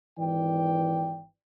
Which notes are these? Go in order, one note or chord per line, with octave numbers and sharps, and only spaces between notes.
G#1 E3 D5 G5